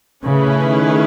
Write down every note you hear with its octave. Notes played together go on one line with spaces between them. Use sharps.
C#3 A3 C#4 E4 G#4 B4
D#3